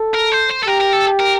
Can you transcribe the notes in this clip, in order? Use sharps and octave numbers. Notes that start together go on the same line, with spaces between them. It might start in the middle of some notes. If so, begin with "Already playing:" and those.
Already playing: A4
A#4
C5
C5
A4
G4 A#4
A#4
A4
A#4